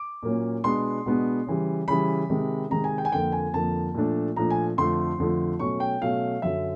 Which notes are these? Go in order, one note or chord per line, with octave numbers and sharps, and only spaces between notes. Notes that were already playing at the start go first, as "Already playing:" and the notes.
Already playing: D6
A#2 F#3 A#3 C#4
B2 G#3 B3 D4 C6
B2 G#3 B3 D4
C#3 E3 G3
C#3 E3 G3 B5
C3 D#3 G#3
C3 D#3 G#3 A#5
G#5
G5
G#5
F2 D3 F3 A#3 G5
G#5
F2 D3 F3 A#3 A5
A#2 F3 A3 D4
A#2 F3 A3 D4 A#5
G#5
F2 D3 F3 A3 C6
F2 D3 F3 A3
B2 F#3 A3 C#4 C#6
G5
B2 F#3 A3 C#4 F5
F#2 D3 F#3 E5